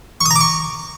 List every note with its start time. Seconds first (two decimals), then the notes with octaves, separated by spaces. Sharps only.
0.21 C#6
0.26 D#6
0.31 A#5
0.36 D6
0.41 C#6